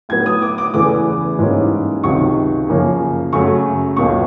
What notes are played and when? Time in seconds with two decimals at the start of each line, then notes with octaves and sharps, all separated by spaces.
0.09 A2 F#3 B3 G#6
0.26 D#6
0.42 D6
0.58 D6
0.74 E2 C#3 E3 A3 D6
1.39 G#2 E3 G3 A#3 C#4
2.03 C#2 C3 D#3 F#3 C#6
2.68 F#2 C#3 F3 A#3 C#4
3.33 F#2 C#3 F#3 A3 C#6
3.97 C#2 B2 F#3 A#3 C#6